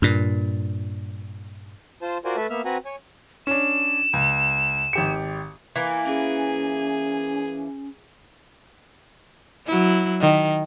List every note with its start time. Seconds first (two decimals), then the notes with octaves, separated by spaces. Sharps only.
0.02 G2 A#2
2.02 F4 C5 A5
2.25 F4 F#4 A#4 C5 D5 G#5
2.37 A3 A4 B4 E5 A5
2.50 A#3 B3 E5 E6 F6
2.65 C4 F#4 B4 F#5 G#5 A#5
2.85 C#5 G#5
3.47 C#4 D4 E7
4.13 C#2
4.93 G#1 G4 C#7
5.76 E3 A#3
6.05 C#4 G#4
9.67 F#3 E4
10.21 D#3